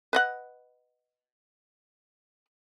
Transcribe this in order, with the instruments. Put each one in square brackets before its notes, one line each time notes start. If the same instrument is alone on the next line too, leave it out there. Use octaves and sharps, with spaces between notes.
[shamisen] B4 D#5 F#5